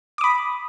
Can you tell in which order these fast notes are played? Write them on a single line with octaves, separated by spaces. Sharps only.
D6 D#6 B5